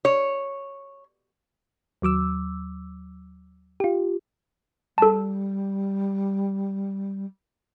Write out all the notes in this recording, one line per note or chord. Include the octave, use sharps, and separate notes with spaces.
C#5
D#2 F#3 D6 E6
F4 G4
G3 A4 A5